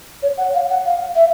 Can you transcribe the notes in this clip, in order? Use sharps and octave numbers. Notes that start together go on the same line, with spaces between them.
C#5
F#5
F5
F#5
F5
E5